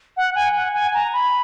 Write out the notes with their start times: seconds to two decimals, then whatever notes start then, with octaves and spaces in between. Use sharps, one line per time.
0.17 F#5
0.35 G#5
0.55 F#5
0.74 G#5
0.94 A#5
1.13 B5